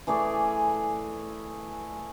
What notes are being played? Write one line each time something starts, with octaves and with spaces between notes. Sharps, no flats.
E3 A3 G#4 D5